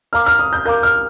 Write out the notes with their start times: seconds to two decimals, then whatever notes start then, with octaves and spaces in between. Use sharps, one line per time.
0.13 A#4 F5 A#5 D6 F6
0.26 F6
0.39 D#6
0.53 G6
0.65 A#4 F5 A#5 D6 G6
0.83 F6